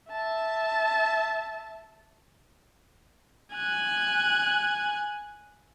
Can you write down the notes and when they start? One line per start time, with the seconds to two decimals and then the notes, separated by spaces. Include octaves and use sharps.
0.11 E5 A5
3.55 G#5 F#6